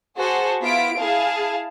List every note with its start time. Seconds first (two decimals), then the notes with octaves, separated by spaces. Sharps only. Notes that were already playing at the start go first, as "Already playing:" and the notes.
0.16 F#4 G#4 C5 F#5 A5
0.62 B3 E4 F4 B6 D7
0.97 E4 G#4 F5 A5